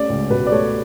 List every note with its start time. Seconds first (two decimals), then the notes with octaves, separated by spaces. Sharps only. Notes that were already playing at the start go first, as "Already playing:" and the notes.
Already playing: A3 C#4 D5
0.09 C#2
0.30 B2 B4
0.47 D5
0.51 A3 C#5